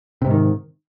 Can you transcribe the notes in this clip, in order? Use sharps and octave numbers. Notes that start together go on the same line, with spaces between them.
G#2 C3 D#3